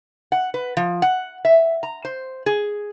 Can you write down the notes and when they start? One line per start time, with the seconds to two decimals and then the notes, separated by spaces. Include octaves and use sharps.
0.32 F#5
0.54 B4
0.77 F3
1.02 F#5
1.45 E5
1.83 A#5
2.05 C5
2.46 G#4